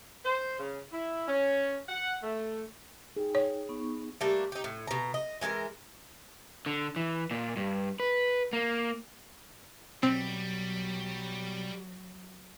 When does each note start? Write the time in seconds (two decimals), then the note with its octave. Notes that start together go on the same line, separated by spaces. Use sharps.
0.25 C5
0.59 C#3
0.92 E4
1.28 C#4
1.89 F#5
2.23 A3
3.17 D#4 G#4 G5
3.35 C#5
3.69 B3 D#4 C#6
4.21 G3 A3 A#3 D4
4.52 D#4 G4
4.64 A2
4.87 B2 A#5
5.14 D#5
5.41 E3 G#3 A4 A#4
6.66 D3
6.96 E3
7.31 A#2
7.57 G2
8.00 B4
8.53 A#3
10.03 B1 F#3 G3 C4